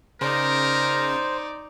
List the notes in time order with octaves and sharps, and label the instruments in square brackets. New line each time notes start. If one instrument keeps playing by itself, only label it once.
[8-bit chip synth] C#3 [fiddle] D#4 D5 [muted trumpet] A#4 [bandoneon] C5